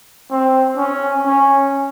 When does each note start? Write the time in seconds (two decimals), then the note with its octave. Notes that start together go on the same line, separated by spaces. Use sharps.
0.31 C4
0.78 C#4
1.26 C#4